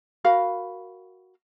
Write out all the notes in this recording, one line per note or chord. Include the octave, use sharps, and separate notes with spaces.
F#4 A#4 F5 B5